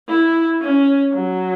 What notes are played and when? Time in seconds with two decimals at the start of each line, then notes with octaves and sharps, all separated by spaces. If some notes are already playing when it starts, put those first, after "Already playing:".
0.08 E4
0.61 C#4
1.13 F#3